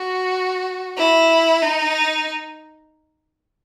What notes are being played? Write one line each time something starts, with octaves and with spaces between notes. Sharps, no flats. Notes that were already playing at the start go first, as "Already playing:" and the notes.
Already playing: F#4
E4
D#4